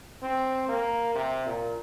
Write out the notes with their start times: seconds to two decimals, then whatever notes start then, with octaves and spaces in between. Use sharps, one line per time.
0.22 C4
0.68 A#3
1.15 C3
1.45 A#2